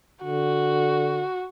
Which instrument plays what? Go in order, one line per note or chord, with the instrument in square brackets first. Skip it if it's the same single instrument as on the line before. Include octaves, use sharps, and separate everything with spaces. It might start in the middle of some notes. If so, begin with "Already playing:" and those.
[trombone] D3 [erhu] F#4